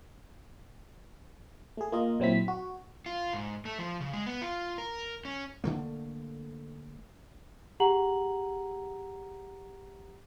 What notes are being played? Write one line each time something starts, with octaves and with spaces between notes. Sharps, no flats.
A3 G#4
A#3 F4 D#5
A#2 F#3 C4 E4 B6
F#4
F4
G#2
A3
F3
C#3
G#3
B3
F4
A#4
C#4
D3 A3 A#3
G4 G#4 F#5 A#5 F#7